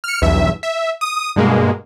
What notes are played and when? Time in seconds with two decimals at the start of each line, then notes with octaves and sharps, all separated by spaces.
0.04 F6 C#7
0.22 B1 E2 G2 E5
0.63 E5
1.01 D#6
1.36 G2 B2 G#3 A#3